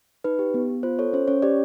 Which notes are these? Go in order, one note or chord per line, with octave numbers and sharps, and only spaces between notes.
D#4 B4
G4
B3
B3
F4 C5
A4 C#5
C#4 C5
C#4 C#5
G4 D5